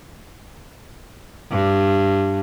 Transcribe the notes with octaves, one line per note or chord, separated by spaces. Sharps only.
G2